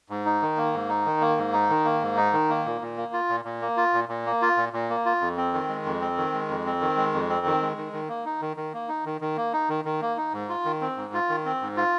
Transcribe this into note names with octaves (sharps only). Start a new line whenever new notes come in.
G#2
D#4
D#3
A#3
G#2
D#4
D#3
A#3
G#2
D#4
D#3
A#3
G#2
D#4
D#3
A#3
A#2
A#2
A#3
F4
A#2
A#2
A#3
F4
A#2
A#2
A#3
F4
A#2
A#2
A#3
F4
F2
C4
D#3
G#3
F2
C4
D#3
G#3
F2
C4
D#3
G#3
F2
C4
D#3
G#3
D#3
D#3
A#3
D#4
D#3
D#3
A#3
D#4
D#3
D#3
A#3
D#4
D#3
D#3
A#3
D#4
G#2
F4
D#3
C4
G#2
F4
D#3
C4
G#2
F4